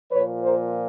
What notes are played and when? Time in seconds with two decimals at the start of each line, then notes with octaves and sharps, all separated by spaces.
0.11 A#2 F3 B4 C#5
0.43 A#4 C5